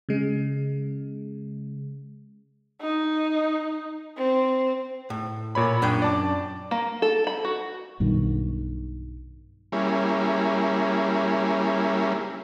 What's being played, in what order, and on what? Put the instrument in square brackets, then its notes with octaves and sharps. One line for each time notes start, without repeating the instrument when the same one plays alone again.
[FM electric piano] C#3 G#3
[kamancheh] D#4
[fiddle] C4
[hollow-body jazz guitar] A2
[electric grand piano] A#2 C#5 B5
[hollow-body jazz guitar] F#2 D4 G5
[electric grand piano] D5 A5 D6
[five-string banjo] A#3
A4
B5
F#4
[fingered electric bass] B1 G2 B2 D#3
[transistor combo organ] G3 A#3 C#4 E4 G#4